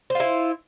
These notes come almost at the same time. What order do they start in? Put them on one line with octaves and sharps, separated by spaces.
C5 F4 E4